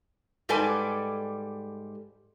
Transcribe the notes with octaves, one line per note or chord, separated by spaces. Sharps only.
G#2 G3 A4 B4 D5 G#5